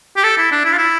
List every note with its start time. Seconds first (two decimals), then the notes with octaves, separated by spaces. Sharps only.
0.17 G4
0.24 A4
0.38 E4
0.52 D4
0.65 E4
0.72 F4
0.78 E4